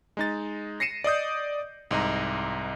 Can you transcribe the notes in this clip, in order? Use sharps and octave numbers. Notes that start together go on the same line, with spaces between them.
G#3 D#4 A6
A#6 C7 C#7 D#7 E7
D5 D#5 D#6 G6
C2 G#2 D#5 A#5